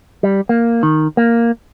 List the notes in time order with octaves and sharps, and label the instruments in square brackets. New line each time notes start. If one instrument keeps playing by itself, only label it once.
[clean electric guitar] G3
A#3
D#3
A#3